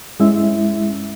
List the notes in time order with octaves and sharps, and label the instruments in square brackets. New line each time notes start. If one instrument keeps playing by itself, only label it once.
[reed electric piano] G2 G#3 C#4 E4 E5